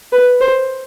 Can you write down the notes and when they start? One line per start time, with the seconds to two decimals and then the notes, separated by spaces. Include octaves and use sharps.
0.12 B4
0.41 C5